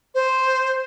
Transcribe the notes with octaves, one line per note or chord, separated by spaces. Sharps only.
C5